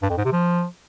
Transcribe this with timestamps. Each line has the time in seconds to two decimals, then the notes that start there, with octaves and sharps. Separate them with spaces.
0.02 G2
0.10 F2
0.17 G#2
0.25 C3
0.32 F3